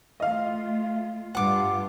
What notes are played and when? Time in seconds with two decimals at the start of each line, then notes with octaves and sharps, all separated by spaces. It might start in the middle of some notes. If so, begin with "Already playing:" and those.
0.20 A3 F4 D#5 F5
1.35 G2 F4 F#5 D6